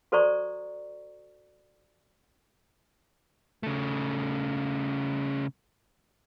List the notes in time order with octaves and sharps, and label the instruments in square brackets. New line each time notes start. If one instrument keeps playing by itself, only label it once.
[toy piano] F#4 A4 C5 D5 A#5 C#6
[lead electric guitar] C#3 A3